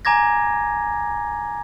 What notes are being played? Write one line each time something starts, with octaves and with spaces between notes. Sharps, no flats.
G#5 A#5 D6 G#6 A#6